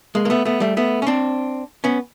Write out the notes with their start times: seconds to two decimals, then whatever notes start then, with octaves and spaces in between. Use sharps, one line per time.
0.15 G#3 A#3
0.25 A#3
0.30 A3 B3
0.45 A3 B3
0.60 G3 A3
0.77 A3 B3
1.02 C#4
1.07 C4 D4
1.84 B3 C#4